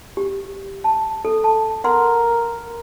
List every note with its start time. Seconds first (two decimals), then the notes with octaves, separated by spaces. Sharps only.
0.17 G4
0.84 A5
1.25 A4
1.44 A5
1.84 A#4 F#5 C6